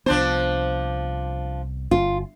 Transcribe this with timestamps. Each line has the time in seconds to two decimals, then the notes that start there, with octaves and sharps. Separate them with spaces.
0.06 C2 F3 B3 D4 C5
1.91 G1 F4